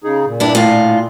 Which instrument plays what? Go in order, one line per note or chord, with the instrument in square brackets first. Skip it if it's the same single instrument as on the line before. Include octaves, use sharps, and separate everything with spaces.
[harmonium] C#3 D#4 G#4
A#2
[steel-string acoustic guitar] G2 D4 E4
A2 F4